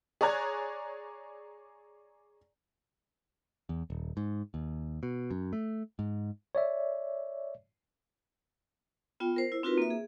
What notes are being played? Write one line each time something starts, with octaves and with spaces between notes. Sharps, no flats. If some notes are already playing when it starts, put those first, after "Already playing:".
G#4 C#5 D5 A#5 F#6 G#6
E2
D#1
G#2
D#2
B2
F#2
A3
G#2
C#5 D5 E5
B3 F4 G5
A#4 C5
E4
C4 D#4 F4 F#4 A#4 B4
A#3 E5
G#4